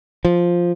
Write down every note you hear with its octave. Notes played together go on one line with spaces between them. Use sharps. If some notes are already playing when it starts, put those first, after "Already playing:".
F3